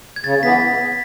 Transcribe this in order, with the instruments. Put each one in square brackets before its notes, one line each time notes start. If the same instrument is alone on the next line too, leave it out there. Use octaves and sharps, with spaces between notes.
[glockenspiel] G#6
[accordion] C#3 [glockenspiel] A6
[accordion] E3 B3 [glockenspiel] B6